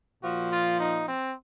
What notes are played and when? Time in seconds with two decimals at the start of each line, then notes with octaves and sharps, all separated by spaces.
0.21 A#2 F3 F#4
0.50 F4
0.78 D#4
1.07 C4